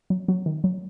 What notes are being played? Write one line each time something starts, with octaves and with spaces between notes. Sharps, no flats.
F#3
F#3
D#3
F#3